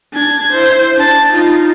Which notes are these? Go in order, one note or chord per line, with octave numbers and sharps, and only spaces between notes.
D4 G#6
E4 C5
D4 A5
D#4 F4